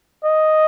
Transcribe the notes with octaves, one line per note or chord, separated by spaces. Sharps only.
D#5